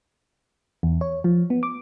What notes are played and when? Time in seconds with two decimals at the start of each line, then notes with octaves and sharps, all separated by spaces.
0.83 E2
1.01 C#5
1.24 F3
1.50 B3
1.63 D6